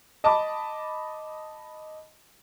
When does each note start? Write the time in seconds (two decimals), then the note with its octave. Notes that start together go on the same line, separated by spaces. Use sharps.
0.24 D#5 A5 B5 D6